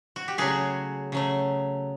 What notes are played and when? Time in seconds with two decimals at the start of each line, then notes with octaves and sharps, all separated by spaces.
0.16 F#4
0.28 G4
0.38 C#3 F#3 A3 F#4 G#4
1.12 C#3 F#3 A3